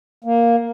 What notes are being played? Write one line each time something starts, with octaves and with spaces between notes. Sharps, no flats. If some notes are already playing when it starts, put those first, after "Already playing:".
A#3